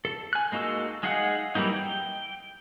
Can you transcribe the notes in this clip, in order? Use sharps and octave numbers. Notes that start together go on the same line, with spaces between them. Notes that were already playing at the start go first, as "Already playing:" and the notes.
A4
G#5 F#6
G#3 A#3 D#4 F#4 A4
G#3 D#4 G#4 F5 F#5
E3 F#3 G3 A#3 D#4
G5